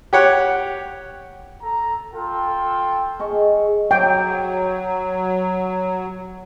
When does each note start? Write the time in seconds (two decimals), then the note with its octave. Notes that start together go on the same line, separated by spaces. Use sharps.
0.13 G4 C#5 F#5
1.62 A4 A#5
2.13 F4 A4 G5
3.20 G#4 D#5 C#6
3.91 F#3 G5